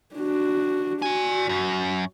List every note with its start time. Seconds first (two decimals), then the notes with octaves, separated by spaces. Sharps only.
0.15 D4 F#4
1.02 F#4 D5 G#5
1.49 F#2